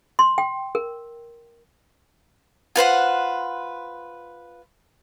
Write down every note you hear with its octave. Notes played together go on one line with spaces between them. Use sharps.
C6
G5
A#4
F4 B4 C5 F#5